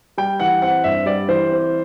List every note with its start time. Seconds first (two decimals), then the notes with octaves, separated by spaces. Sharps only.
0.18 G3 G5
0.40 E3 F#5
0.62 C4 F#5
0.84 G2 E5
1.06 G3 D5
1.28 E3 C5
1.50 C4